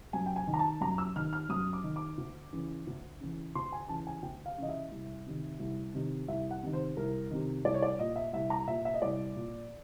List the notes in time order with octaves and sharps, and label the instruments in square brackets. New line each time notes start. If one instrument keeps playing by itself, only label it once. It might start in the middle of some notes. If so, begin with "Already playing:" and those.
[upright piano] F#2 G#5
G5
G#5
D#3
A#5
A5
F#2 A#5
E6
D#3 F6
F6
F#2 D#6
D6
D#3
D6
D2
C#3 E3
D2
C#3 E3
D2 C6
G#5
C#3 E3 A5
G#5
D2 G5
F5
C#3 E3 D#5
E5
C2
C3 D#3
C2
C3 D#3
C2 E5
F#5
C3 D#3
C5
C2 A#4
C3 D#3
C2 D5
C#5
D5
A#2 D#5
E5
C2 E5
A#5
A#2 E5
E5
D#5
C2 D5
A#2